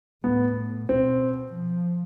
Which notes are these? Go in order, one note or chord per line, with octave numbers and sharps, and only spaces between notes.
A2 B3
B2 C4
F3